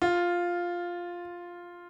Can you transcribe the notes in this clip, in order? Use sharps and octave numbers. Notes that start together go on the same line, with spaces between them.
F4